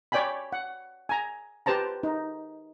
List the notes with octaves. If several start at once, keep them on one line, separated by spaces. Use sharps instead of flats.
C#5 D5 G5 G#5 B5
F#5
G#5 A#5
G4 B4 C5 A5 A#5
D#4